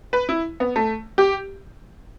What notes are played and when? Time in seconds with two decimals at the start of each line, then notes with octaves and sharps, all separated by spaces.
0.13 B4
0.29 E4
0.60 B3
0.76 A3
1.18 G4